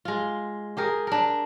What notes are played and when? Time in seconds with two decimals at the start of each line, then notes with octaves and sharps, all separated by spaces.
0.05 G#3 F4
0.77 G4 G#4 A#4
1.07 D4 A#4